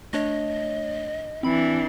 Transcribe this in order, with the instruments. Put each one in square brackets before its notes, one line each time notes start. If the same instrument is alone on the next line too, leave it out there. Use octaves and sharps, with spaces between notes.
[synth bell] A3 D4 C#5 [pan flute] D#5
[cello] E3 D4 [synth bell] C4 B5